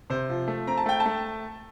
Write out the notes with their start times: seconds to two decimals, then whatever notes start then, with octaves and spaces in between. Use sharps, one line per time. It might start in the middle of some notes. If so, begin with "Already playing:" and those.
0.10 C3 C5
0.29 F3
0.48 A3
0.67 C4 A#5
0.77 A5
0.86 A3 G5
1.00 A5
1.06 A3